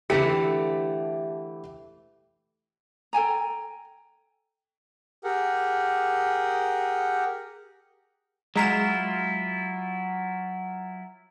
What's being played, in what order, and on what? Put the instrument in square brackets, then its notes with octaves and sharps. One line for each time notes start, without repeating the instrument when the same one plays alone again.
[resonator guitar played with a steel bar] D3 E3 A3 [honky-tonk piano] G4 C#7
[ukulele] A4 G5 G#5 A#5
[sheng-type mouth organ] G4 G#4 A#4 F#5
[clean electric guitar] F#3 E4 F4 [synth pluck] G#3 A#5 E7